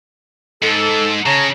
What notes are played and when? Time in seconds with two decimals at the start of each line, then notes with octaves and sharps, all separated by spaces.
0.62 G#2 A4
1.26 C#3 C#5 A5 A#5